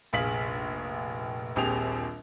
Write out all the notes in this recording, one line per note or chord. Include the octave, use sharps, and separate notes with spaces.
F1 A#1 G#4 F5 B6 F#7
D#1 A#1 C4 G4 G#4 F7